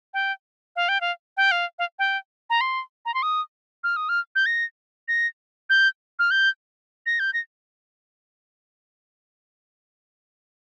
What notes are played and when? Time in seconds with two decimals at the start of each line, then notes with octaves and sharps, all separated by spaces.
0.14 G5
0.76 F5
0.89 G5
1.01 F5
1.37 G5
1.51 F5
1.79 F5
1.99 G5
2.50 A#5
2.61 C6
3.05 A#5
3.14 C6
3.23 D#6
3.84 F6
3.96 D#6
4.09 F6
4.36 G6
4.46 A#6
5.08 A#6
5.70 G6
6.19 F6
6.31 G6
7.06 A#6
7.20 G6
7.34 A#6